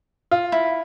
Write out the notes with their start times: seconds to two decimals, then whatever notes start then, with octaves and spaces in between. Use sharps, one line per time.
0.31 F4
0.52 E4